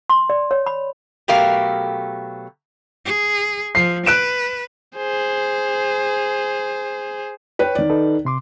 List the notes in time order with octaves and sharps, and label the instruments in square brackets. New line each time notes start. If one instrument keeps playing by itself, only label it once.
[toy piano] C6
D5
C#5
B5
[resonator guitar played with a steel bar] B2 F#3 A3 G4 A#4 F5
[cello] G#4
[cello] F3 [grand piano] C7
[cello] B4 [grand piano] F#6 D7 E7
[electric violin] G#4 C5
[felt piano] B4 C#5 G5
D#3 D5
[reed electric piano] D#4 A4 B4
C3 C6 D6